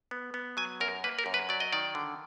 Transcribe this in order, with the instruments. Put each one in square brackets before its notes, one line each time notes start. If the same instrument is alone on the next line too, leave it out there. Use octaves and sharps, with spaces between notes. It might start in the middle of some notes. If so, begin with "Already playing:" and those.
[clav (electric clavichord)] B3
B3
F#3 G#5
F#2 A#4
A#3 B4
A#4
F#2
B4
F#3 D5
D#5
D#3 D5
D3